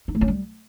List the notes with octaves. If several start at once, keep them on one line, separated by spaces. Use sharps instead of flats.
D#4
A3
C#4
G3